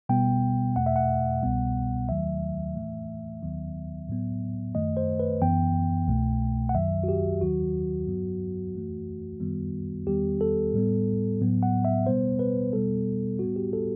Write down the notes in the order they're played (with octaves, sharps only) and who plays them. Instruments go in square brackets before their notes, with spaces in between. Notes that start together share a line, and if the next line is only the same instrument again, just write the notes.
[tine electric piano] B2 G3 B3 G5
E2 B2 A3 F#5
E5
F#5
C2 B2 G3 B3
D#2 D#3 F#3 A3 E5
A2 E3 A3
D#2 D#3 F#3 B3
A2 F#3 B3
F#2 D#3 A3 D#5
C5
B4
F#2 E3 B3 G5
C2 B2 A3
F#5
F#2 D#3 F#3 E5
F#4
G4
D#2 D#3 F#3 F#4
G2 F#3 B3
F#2 E3 A3
F#2 D#3 G3 B3
E2 D#3 G3 B3 G4
A4
A2 G3 B3
A2 F#3 B3
F#5
E5
B2 G3 B3 C5
B4
B2 G3 B3 A4
A2 G3 B3 F#4
G4
A4